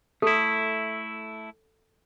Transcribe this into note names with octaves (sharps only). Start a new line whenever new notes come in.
A3 E4 A4